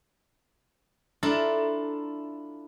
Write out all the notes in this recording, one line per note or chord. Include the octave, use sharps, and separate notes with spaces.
D4 E4 F4 A4 A#4